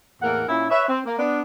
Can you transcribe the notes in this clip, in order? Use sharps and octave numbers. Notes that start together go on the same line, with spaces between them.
E2 A2 A#3 A#4 F#5
A#2 C#4 E4
B4 C#5 E5
C4
A#3
B3 D4